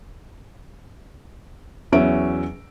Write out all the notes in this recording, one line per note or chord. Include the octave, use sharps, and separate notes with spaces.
E2 F#3 C#4 E5 D7